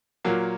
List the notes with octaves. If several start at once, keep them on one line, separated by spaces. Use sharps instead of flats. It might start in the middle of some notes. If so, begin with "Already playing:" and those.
A#2 F#3 A#3